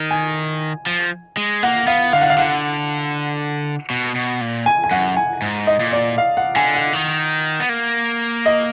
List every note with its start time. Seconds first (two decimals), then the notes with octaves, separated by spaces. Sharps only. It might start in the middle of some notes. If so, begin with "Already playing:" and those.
Already playing: D#3
0.11 G#5
0.86 F3
1.37 G#3
1.63 A#3 F#5
1.87 B3 F5
2.13 D3 F5
2.21 F#5
2.30 F5
2.38 D3 F#5
3.90 B2
4.15 B2
4.41 A#2
4.66 G#5
4.84 G#5
4.91 F#2 F#5
5.17 G#5
5.42 G#2
5.67 D#5
5.80 A#2
5.93 D5
6.18 F5
6.37 F#5
6.56 D3 G#5
6.75 F#5
6.93 D#3
7.60 B3
7.69 A#3
8.46 D#5